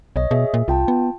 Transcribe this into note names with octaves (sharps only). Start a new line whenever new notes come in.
B1 C#5 D#5
B2 G#4 E5
A#2
C2 F4 G5 A5
B3